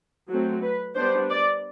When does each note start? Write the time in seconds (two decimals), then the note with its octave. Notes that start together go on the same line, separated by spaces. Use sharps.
0.29 F#3 A3 C4
0.61 B4
0.95 G3 B3 D4 C5
1.30 D5